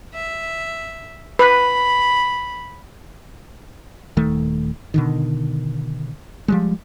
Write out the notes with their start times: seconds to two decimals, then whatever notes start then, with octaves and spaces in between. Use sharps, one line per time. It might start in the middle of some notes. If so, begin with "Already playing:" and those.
0.14 E5
1.39 B4 B5
4.17 D#1 D#3 A3
4.94 B2 D3 D#3
6.48 F3 G3 G#3